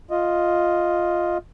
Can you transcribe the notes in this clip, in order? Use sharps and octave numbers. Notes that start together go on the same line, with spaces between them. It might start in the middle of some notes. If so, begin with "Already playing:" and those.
F4 D#5